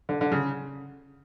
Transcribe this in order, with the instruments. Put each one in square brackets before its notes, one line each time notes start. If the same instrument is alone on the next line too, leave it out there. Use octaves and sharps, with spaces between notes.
[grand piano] D3
D3
C#3